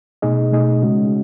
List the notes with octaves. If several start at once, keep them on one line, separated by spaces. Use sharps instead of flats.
B2 A3 D#4 G#4 D#5
B2 A3 D#4 G#4 D#5
C#3 G#3 C#4 F#4